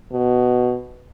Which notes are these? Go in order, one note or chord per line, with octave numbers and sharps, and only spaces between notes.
B2